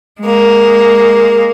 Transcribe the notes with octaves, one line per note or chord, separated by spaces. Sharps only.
G#3 A#3